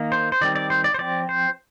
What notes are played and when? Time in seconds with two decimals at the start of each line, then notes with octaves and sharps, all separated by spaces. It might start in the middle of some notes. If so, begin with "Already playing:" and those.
Already playing: D#3 A#3
0.12 C5
0.32 C5
0.41 D#3 G3 C4 D5
0.56 D5
0.70 C5
0.84 D5
0.94 C5
0.99 F3 C4 D5
1.29 C5